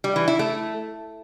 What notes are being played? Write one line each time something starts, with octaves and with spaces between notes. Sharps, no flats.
G3
E3
E4
A3